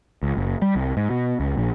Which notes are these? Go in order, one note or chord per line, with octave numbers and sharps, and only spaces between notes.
C#2
F#1
G3
C2
G#2
B2
C#2
A#1